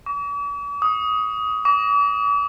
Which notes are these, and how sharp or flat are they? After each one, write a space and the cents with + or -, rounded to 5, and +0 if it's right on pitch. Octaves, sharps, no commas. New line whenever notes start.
D6 -45
D#6 +15
D6 -40